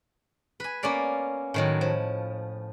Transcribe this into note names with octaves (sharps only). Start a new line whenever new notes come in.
B4 G#5
A#3 B3 C#4 D5 F5
A2 D#3 F#3
F3